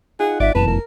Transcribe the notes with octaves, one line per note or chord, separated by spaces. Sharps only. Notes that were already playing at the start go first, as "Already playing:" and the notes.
D#4 F4 G#4 F#5
G#1 D5 E5
F#1 F#2 B2 E3 B4 A5
F1 A#4